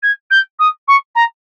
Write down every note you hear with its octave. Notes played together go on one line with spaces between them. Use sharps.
G#6
G6
D#6
C#6
A#5